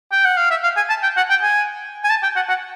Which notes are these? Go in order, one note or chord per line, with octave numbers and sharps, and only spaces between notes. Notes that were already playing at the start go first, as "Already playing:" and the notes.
G5
F#5
F5
E5
F5
G#5
A5
G5
F#5
G5
G#5
G#5
A5
G5
F#5
F#5